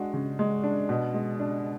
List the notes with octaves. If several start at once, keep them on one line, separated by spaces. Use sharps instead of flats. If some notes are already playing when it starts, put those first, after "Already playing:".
Already playing: G#3 D4 F#4
C#3
G#3
D4
B2
G#3
D4